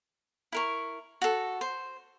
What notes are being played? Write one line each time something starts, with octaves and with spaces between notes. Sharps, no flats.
E4 A#4 C#6
F#4 A4
C5